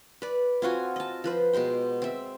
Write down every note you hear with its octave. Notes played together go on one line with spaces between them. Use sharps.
B4 D5
C4 F4 F#4 G#5
D#5 A5
F3 B4 C5
B2 G#3 C5 G5
C4 E5